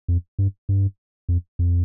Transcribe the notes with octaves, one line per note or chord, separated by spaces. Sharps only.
F2
G2
G2
F2
F2